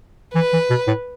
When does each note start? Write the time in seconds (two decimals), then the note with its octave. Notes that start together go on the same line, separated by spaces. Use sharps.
0.34 E3 B4
0.53 E3
0.70 B2
0.87 A2